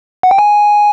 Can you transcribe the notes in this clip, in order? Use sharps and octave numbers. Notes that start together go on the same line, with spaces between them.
F#5
G5
G#5